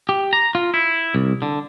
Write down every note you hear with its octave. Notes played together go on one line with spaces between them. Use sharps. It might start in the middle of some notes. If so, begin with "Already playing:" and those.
G4
A#5
F4
E4
C2
D3